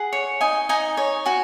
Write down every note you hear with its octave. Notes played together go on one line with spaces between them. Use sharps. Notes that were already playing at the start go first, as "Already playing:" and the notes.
Already playing: G#4 F#5
C#5
D#4 D#5 G#5
D#4 D#5 G#5
C#5
F#4 G#5 C#6